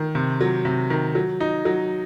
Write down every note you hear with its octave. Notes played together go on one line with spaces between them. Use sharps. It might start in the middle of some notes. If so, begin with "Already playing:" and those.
Already playing: D#3
C3
F#3
C3
D#3
F#3
D#4
F#3